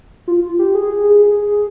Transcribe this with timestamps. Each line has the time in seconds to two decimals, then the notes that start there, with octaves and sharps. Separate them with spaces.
0.28 F4
0.59 G4
0.75 G#4
1.23 G#4